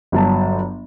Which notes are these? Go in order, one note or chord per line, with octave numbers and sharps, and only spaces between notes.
G1 F#3 A5